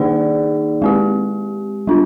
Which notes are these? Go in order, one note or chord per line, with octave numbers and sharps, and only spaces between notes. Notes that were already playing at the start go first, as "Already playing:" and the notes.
Already playing: D#3 A#3 D#4 G#4 D5
G#3 C4 G4
G3 D4 F4